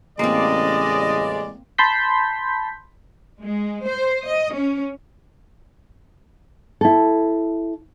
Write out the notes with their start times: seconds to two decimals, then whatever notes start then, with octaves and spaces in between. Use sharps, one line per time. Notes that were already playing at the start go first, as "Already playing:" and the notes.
0.19 A1 C#3 G#3 A#3 C4 D5 D#5
1.78 A5 B5 C6 G6 B6
3.41 G#3
3.85 C5
4.24 D#5
4.53 C#4
6.81 E4 A4